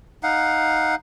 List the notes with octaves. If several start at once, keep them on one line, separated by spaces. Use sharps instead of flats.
D#4 F5 F#5